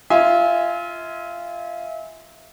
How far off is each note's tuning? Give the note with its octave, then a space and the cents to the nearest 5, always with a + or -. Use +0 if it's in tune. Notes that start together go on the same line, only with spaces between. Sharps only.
F4 -15 E5 -35 G#5 +0